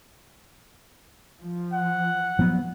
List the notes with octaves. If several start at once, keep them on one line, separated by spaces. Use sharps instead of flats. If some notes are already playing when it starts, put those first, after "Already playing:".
F3
F#5
F3 F#3 B3